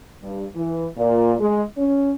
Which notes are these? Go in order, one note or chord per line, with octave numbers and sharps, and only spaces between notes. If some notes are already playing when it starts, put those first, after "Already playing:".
G2
E3
A#2
G#3
C#4